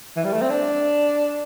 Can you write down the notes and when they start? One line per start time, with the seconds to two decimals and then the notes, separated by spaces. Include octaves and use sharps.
0.16 E3
0.24 G3
0.33 A3
0.42 C4
0.50 D4